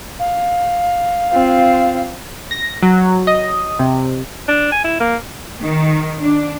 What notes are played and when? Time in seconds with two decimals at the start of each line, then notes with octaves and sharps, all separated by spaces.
0.19 F5
1.31 C4 F4
2.51 A#6
2.83 F#3
3.27 D#5
3.79 C3
4.48 D4
4.72 G#5
4.84 E4
5.00 A#3
5.62 D#3
6.20 D4